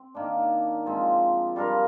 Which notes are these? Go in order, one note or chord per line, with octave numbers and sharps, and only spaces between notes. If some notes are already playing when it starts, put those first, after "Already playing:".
Already playing: C4
D#3 A#3 D4
F3 G#3 C4
G3 D4 F4 A#4